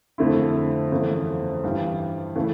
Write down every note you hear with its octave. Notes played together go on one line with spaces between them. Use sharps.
F2 D3 A3 E4
G1 F2 C#3 E3 A3
G2 E3 G3
C#3 E3 A3